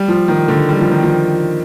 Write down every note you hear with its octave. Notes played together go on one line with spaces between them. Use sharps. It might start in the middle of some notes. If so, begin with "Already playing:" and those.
Already playing: G3
F3
D#3
D3
G3
F3
D#3
F3